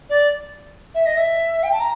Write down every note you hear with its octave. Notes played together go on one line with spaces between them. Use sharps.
D5
E5
D#5
E5
G5
A5
A#5